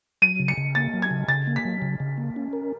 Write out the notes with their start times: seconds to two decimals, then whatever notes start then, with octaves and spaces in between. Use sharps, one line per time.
0.22 F#3 D#7
0.40 C#3
0.48 C#7
0.58 C#3
0.75 A#3 A6
0.94 F#3
1.02 G#6
1.11 C#3
1.28 C#3 A6
1.47 A#3
1.56 B6
1.65 F#3
1.82 C#3
2.00 C#3
2.18 A#3
2.36 C#4
2.53 A#4